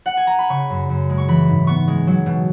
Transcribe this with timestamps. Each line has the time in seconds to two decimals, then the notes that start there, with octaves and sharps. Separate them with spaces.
0.06 F#5
0.17 G#5
0.27 A#5
0.39 B5
0.49 C#3 C#6
0.70 F#2
0.89 F#2
1.09 G#3
1.18 C#6
1.28 E3 B5
1.48 G#2
1.67 B3 C#6
1.88 G#3
2.07 F#3
2.26 B2